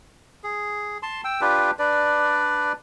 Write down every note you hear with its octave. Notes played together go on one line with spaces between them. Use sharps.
G#4
A5 C6
G5 E6
D4 F4 G4 B4
D4 B4 D5